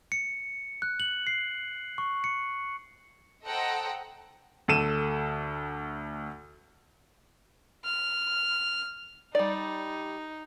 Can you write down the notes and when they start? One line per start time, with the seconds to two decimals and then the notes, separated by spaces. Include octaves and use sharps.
0.12 C#7
0.82 F#6
1.00 F#7
1.27 C7
1.98 C#6
2.24 C#7
3.45 A4 C5 D#5 F#5 G5 A#5
4.68 D2 A4 D#7 E7
7.85 F6
9.35 G3 D#4 D5